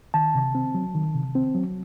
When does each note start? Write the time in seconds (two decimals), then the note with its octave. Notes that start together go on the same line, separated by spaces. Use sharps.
0.14 D#3 A5
0.35 C3
0.55 C4
0.74 F#3
0.94 D#3
1.15 C3
1.35 C4
1.54 F#3